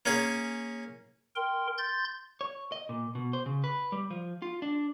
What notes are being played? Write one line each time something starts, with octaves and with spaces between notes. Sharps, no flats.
A#3 C#4 G#4
A#4 G5 C6
C6 G6 A6
C#5
D#5
A#2
B2
C5
C#3
B4
G3
F3
F4
D4